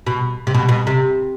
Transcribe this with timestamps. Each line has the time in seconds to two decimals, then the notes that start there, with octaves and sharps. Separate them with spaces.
0.07 B2
0.47 C3
0.54 B2
0.69 B2
0.87 C3